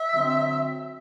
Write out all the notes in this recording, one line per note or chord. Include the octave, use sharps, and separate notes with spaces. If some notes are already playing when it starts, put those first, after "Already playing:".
Already playing: E5
D3 F#3 C4